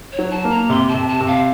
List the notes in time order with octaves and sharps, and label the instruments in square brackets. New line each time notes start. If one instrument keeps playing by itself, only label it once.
[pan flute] C#5
[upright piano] F#3
[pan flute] A5
[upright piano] A#3
[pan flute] A#5
[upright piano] C3 [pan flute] C6
[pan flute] A5
[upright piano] C3
[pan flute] A5
[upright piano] C3
[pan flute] F5